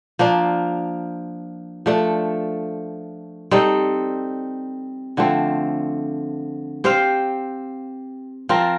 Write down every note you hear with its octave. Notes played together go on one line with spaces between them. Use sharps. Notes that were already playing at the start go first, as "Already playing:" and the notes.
F3 A#3 D4
F3 A3 D4 A4
G3 C4 D#4 A4
D3 F3 A3 C4
C4 G4 C5 F5
F3 C4 F4 A#4